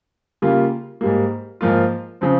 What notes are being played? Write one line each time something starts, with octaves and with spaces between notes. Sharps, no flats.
C#3 G3 A#3 F4
G#2 G3 A#3
G#2 F3 A#3 F4
C#3 F3 C4